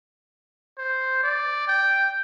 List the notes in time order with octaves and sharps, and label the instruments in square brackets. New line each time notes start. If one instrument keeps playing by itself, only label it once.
[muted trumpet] C5
D5
G5